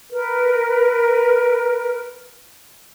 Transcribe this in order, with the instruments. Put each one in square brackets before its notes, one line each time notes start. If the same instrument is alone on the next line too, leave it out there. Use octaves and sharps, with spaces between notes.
[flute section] A#4 B4